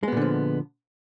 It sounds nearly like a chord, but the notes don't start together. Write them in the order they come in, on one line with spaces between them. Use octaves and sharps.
G#3 B3 A#2 D3 F3